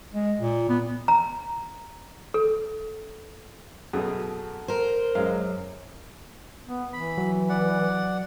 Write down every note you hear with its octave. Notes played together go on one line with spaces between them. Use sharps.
G#3
A#2
B3
A#5
A4
F#2 B2 G#4 A4
A#4 C5
F#2 G#3 F5
B3
E3 B5
F#3
D5 F#5